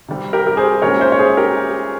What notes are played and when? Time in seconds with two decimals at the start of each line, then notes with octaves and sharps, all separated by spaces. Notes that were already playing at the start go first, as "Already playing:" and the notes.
0.08 C3 G3 C4
0.33 G4 A#4
0.47 A#4
0.57 G#4 C5
0.82 A#2 G#3 C#4 A#4 C#5
1.00 C5 E5
1.12 C#5
1.19 G#4 C5
1.37 G4 A#4